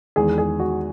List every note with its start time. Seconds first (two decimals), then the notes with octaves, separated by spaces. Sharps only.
0.16 E2 D#3 G#3 G#4
0.38 G#4
0.60 F#4